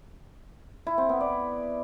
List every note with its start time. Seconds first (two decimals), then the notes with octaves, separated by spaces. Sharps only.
0.87 E4
0.98 C4
1.09 B3
1.20 D5